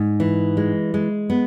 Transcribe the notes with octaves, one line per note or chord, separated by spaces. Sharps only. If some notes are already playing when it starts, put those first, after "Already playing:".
Already playing: G#2
E3
G#3
G#3
B3